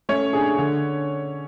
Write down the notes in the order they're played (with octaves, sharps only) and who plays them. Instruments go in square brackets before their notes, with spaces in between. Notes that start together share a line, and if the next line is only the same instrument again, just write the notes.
[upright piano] A3 [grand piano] C#4 C#5
[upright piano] D4 G#4
D3